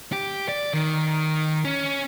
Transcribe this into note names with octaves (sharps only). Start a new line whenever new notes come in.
G4
D5
D#3
C#4